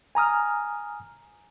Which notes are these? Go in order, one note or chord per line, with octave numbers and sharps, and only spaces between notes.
G#5 A#5 D#6 F6